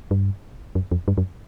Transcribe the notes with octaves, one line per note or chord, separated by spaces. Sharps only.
G2
F#2
F2
G2
F#2